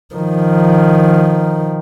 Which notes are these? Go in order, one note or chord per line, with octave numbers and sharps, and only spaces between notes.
D#3 F3